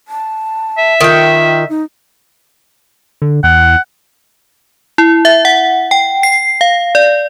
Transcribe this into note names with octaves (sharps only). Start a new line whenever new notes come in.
A5
E5
D#3 F4 G5
D#4
D3
E2 F#5
E4
E5
F#5
G5
C7
F5
D5